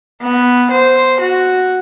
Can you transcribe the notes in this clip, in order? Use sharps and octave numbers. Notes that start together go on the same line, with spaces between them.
B3
C5
F#4